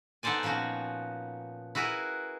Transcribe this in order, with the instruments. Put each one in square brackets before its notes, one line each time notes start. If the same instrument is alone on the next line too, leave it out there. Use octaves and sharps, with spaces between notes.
[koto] B3 D#4 A4 C5 D5 G#5
A#2 F3 B3 C#4 F#4
E4 F#4 G#4 A#4 B4